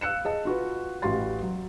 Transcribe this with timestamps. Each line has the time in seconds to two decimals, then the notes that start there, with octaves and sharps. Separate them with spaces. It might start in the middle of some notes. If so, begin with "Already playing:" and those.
0.01 F5 E6 F#6 C#7 E7
0.25 G#4 D#5 A5
0.45 F4 F#4 B4
1.02 A1 F#4 G4 F5 C6 A6
1.42 F#3